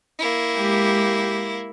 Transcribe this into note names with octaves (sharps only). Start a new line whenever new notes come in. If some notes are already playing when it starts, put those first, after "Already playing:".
A#3 E4
G#3 G4